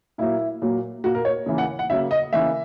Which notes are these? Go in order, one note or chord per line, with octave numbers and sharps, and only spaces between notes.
A#2 F#3 A#3 E4
A#2 F#3 A#3
A#2 A#3 F#4
A#4
C#5
C#3 E3 A#3
F#5
F#5
C#3 F#3 A#3 E5
D#5
C#3 E3 A#3 E5